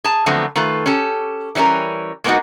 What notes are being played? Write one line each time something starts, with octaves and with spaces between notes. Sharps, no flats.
G#4 A5
D3 F3 F#3 A3 B3 C4
D#3 A3 F4 B4
C#4 G4 A4
E3 G3 C#4 D#4 A#4
G#3 A#3 B3 C#4 D#4 F#4